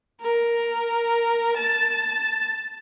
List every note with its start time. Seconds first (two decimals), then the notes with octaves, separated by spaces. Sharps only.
0.21 A#4
1.57 A5